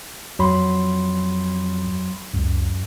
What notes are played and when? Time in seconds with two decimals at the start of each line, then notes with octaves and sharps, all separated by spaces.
0.39 F2 F#3 B5 C6
2.34 C#2 F#2